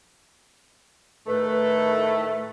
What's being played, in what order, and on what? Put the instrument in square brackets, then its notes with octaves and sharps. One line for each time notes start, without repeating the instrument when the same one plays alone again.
[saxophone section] A2 D#3 A3 [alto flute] B4